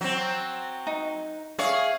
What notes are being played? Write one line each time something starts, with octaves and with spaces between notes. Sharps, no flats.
F#3 C4
D#4
G#4 C#5 E5 F5